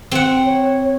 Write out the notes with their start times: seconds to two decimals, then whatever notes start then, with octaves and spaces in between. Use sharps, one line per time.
0.11 C4 F#5
0.45 C#5